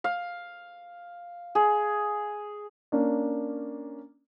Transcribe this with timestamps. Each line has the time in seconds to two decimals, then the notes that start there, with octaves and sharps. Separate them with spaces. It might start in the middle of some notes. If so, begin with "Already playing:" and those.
0.04 F5
1.55 G#4
2.92 A#3 C#4 D4